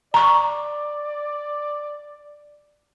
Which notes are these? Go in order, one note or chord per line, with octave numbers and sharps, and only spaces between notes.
D5 A#5 C#6